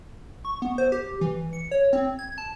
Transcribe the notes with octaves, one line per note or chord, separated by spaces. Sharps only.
C#6
B3
C5
G4
E3
C#7
C#5
C4
G#6
A5